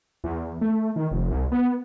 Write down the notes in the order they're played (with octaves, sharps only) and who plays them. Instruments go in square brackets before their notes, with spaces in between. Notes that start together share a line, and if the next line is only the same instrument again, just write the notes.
[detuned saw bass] E2
A3
D#3
F1
C2
B3